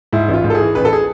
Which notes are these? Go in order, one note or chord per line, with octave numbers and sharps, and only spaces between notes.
G#2 E4
A1
F4
G#2
A4
G#4
E3
A1 B4
A4
G#4